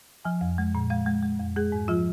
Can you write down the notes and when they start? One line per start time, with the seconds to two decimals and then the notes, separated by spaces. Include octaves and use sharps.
0.25 F3 G#5
0.41 F2
0.58 G#3
0.75 A#2
0.90 G#3 F5
1.07 G#3
1.23 G#3
1.39 F2
1.56 G#3 G#4
1.72 G#2
1.88 F3 F4